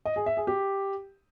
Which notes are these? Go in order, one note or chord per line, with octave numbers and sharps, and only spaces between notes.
D#5
G#4
E5
G#4
G4